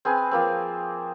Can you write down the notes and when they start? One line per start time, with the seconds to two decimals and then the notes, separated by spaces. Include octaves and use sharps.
0.05 C4 G#4 B4 G#5
0.31 F3 A#3 C4